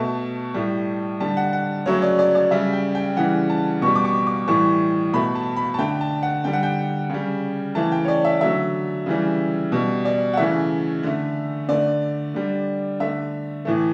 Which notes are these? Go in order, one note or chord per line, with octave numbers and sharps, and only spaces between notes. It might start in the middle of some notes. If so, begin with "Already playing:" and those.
Already playing: B2 A3 A5
A2 G3
D3 G3 A5
F#5
F#5
C#3 F#3 A3 C#5
D5
D5
D5
C#3 G3 E5
G5
G5
C#3 E3 G3 F#5
A5
B2 G3 C#6
D6
C#6
D6
A2 E3 G3 C#6
B2 A3 B5
A5
B5
A5
D3 A3 G5
A5
F#5
D3 G3 G5
F#5
G5
C#3 G3
C#3 E3 A3 A5
G5
C#5
D5
E5
D3 F#3 A3 E5
C#3 E3 G3
B2 G3
D5
F#5
C#3 E3 A3 E5
D3 A3
D3 A3 D5
D3 G3
D3 A3 E5
A2 E3 A3